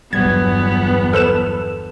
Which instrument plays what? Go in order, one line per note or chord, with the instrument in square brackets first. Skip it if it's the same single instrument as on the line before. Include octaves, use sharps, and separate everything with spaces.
[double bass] G1 E2 [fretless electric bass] F#3 G3 [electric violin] B3 [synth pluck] G#6
[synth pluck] A4 B4 E7